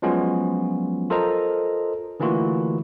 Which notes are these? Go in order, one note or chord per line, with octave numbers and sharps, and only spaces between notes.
F3 F#3 G#3 B3 C#4 F4
F4 A4 A#4 C5 D#5 A#5
D3 E3 A3 A#3 F4 F#4